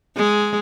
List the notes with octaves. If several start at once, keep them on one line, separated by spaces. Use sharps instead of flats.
G#3